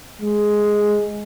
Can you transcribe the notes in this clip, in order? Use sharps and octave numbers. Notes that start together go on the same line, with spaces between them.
G#3